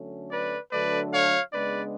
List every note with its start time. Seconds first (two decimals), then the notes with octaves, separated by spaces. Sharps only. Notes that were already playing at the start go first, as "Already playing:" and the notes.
Already playing: D3 F#3 A3 C#4
0.31 B4 D5
0.72 D3 F#3 A3 D4 B4 D5
1.12 C#5 F5
1.53 C#3 G#3 B3 D4 B4 D5